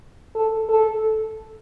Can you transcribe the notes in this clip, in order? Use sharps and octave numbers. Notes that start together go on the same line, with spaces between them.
A4
A4